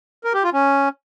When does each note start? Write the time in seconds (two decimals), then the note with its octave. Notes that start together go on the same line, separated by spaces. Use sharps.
0.24 A#4
0.34 G4
0.44 F4
0.53 C#4